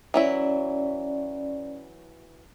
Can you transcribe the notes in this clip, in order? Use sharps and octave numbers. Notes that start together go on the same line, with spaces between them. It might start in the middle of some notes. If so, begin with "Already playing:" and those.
E3 F#3 C#4 E4 D5